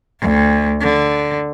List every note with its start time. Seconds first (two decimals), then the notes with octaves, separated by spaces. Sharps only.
0.21 D2
0.80 D3